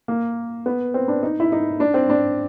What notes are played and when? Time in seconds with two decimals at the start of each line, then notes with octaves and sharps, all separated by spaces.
0.08 A#3
0.66 B3
0.94 C4
1.08 D4
1.23 D#4
1.40 E4
1.52 D#4
1.80 D4
1.94 C4
2.10 D4